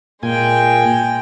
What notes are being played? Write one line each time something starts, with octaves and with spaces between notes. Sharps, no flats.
A#2 G#3 G5 G#5